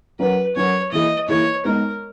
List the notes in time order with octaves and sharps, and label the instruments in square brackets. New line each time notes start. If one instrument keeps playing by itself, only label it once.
[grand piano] F#3 C#4 F#4 A#4 [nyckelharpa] B4
[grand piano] F#3 C#4 F#4 A#4 [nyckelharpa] C#5
[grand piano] E3 A#3 E4 G#4 [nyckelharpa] D#5
[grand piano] E3 A#3 E4 G#4 [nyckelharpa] C#5
[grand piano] G#3 B3 D#4 [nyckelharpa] A#4